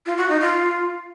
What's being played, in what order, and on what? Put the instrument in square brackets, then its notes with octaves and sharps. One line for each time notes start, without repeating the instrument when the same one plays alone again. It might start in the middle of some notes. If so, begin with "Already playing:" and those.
[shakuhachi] F4
F#4
D#4
F4